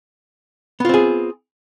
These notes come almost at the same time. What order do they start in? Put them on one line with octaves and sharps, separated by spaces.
B3 F4 C4 G#4